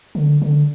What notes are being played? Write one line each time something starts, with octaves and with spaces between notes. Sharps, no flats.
D3
D3